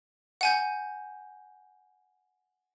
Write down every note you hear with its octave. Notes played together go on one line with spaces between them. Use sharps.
F#5 G#5 G6